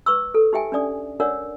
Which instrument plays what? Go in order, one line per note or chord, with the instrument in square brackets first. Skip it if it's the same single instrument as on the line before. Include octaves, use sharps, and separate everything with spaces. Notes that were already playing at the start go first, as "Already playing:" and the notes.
[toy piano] B4 C#6 E6
A4
D#4 G4 E5 G5 G#5
C#4 D4 D5 D#6
D4 A#4 C#5 D5 F#5 E6